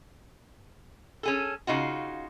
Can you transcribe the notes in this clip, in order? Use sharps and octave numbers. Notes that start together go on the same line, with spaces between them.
C#4 G#4 A4
C#3 D#4 F4 F#4